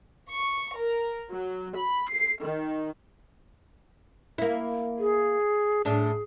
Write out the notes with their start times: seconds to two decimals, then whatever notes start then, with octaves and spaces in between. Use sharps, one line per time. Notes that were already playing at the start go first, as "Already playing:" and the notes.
0.33 C#6
0.75 A#4
1.31 F#3
1.76 B5
2.10 C7
2.43 D#3
4.38 A#3 E4
4.99 G#4
5.85 A2 D4 G#4